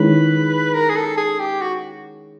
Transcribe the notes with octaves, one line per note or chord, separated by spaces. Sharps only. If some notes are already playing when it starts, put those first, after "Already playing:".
Already playing: D#3 G#3 C#4 E4 B4
A#4
G#4
A4
G#4
G4
F#4